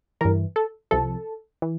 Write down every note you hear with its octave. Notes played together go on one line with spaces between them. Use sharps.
G2 E3 A#4
A4
C2 C3 F3 A4
E3